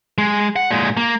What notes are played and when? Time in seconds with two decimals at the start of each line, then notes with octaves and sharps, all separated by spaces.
0.18 G#3
0.56 F#5
0.71 A#2 G#3
0.97 A#3